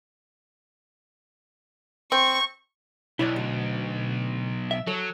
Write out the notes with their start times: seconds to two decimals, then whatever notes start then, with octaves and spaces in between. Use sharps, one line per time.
2.12 C4 C#6
3.19 B1 E4 C#5 D5
3.36 D2
4.71 E5
4.87 F#3 A4 C#5